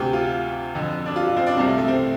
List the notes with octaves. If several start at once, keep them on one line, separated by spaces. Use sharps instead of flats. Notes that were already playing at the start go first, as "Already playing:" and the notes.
Already playing: D2 C3 G4
F4
F2 D3
D4
F4
F4
C4
D4
C2 C3 C4
A3
A3
C4